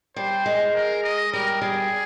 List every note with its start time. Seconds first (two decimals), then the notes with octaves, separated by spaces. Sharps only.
0.16 G3 C5
0.46 G#3
0.75 A#4
1.03 D#5
1.33 G3 A#4
1.62 G3 G#4